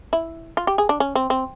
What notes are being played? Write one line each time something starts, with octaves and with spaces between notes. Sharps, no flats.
E4
F4
G4
G#4
D4
C#4
C4
C4